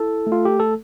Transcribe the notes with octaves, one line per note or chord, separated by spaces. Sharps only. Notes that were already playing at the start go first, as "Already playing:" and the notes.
Already playing: E4 A4
A3
F4
G4
A4